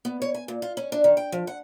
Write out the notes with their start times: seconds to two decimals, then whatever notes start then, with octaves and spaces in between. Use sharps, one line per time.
0.05 B3
0.22 C#5
0.34 G#5
0.48 A#2
0.62 F4
0.77 C#4
0.92 D4
1.04 D#3
1.17 G5
1.32 F3
1.47 F#5